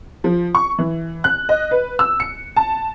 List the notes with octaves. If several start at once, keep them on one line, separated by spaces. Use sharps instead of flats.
F3
C#6
E3
F#6
D#5
B4
E6
C#7
A5